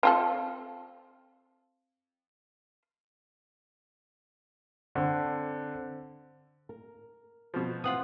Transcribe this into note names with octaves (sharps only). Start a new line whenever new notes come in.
C4 F4 A4
D3 C4
A#4
B2 F3
E3 C4 F4 F#5 D#6